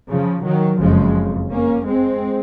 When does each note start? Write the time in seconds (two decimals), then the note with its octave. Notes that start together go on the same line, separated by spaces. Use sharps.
0.09 C#3 F3
0.44 D#3 F#3
0.80 F#1 F2 C#3 F3 G#3
1.50 A#3 C#4
1.86 G#3 C4